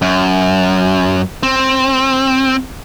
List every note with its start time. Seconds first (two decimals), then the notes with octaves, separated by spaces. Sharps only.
0.02 F#2
1.43 C4